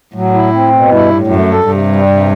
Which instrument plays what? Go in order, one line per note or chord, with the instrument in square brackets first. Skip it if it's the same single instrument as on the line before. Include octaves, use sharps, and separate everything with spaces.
[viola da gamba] A2 [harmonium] F#3
[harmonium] E4
C4
B2
[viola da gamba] G2 [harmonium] E4
[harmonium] A2
[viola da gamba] F#2 [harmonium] A3
[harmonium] A4
[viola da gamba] G2 [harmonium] C3
[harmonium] G3
C3